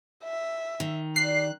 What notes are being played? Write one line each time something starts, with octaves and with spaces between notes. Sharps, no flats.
E5
D#3
G4 D5 F#6 C7